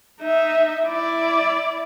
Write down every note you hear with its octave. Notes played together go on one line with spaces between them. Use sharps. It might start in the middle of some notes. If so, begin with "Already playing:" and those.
D#4 E5
E4 D5